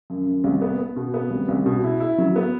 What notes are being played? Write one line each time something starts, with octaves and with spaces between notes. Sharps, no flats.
F#2
F#2
C2
B3
B3
B2
B3
C2
C2
B2
E4
E4
F#3
B3